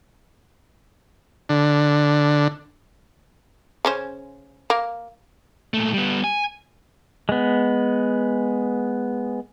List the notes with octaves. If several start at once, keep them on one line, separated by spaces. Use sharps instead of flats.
D3
C#3 C#4 C5
A#3
A#2 A3
G3 B3
G#5
G#3 B3